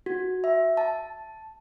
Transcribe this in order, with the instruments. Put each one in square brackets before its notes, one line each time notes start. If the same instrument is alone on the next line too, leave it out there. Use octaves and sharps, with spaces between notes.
[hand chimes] F#4
E5
A5